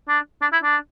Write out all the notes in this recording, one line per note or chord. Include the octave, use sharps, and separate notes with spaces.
D4
D4
E4
D4